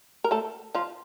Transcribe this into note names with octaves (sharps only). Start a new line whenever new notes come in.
A#4
A3 A4
F3 F4